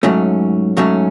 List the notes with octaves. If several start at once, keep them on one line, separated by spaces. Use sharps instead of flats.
G#2 F#3 A3 C#4
G#2 F#3 A3 C#4